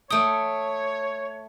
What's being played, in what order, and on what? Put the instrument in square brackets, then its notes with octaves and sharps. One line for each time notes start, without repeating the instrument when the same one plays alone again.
[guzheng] A3 G5 [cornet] C#5 [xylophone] D#6